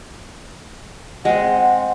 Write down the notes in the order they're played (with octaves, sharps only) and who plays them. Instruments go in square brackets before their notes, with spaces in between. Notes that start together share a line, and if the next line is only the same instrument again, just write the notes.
[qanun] G#3 C4 [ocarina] F#5